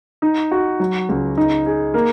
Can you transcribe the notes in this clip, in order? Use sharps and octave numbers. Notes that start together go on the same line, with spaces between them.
D#4
F#4
F#3
C#2
D#4
G#4
A#3